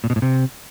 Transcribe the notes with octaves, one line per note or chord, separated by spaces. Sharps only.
A#2
B2
A2
C3